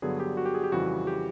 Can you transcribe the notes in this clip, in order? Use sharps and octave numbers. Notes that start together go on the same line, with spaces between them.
G2 D3 F#3 B3 G#4
G4
F#4
G4
G#4
G4
F2 C#3 E3 G3 F#4
G4